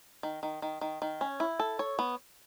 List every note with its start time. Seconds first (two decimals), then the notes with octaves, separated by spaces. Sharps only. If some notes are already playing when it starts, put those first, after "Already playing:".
0.23 D#3
0.43 D#3
0.62 D#3
0.81 D#3
1.02 D#3
1.21 C#4
1.40 E4
1.59 A4
1.79 C#5
1.99 B3